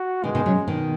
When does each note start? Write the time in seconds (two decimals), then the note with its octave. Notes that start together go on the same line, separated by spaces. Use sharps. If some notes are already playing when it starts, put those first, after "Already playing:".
Already playing: F#4
0.24 B2 D#3 G#3
0.35 B2 D#3
0.46 C#3 F#3
0.68 B2 D#3